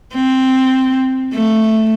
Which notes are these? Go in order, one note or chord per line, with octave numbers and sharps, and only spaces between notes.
C4
A3